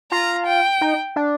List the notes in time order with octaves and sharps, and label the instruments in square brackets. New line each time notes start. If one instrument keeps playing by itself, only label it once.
[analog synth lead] F4 [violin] A#5
[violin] G5
[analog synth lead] D#4
D4